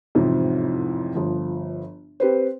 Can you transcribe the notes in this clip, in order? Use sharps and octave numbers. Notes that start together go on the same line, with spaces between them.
A1 F2 G#2 C3
G1 F3
C4 G4 B4 C5